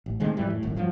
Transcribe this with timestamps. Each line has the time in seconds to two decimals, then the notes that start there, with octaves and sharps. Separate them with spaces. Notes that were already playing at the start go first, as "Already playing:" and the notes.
0.06 A1
0.20 C3 D#3 G#3 A3
0.37 F2 G#2 E3 G3
0.50 A2
0.63 D#1 G#1 F#2
0.76 F1 G2 F3 F#3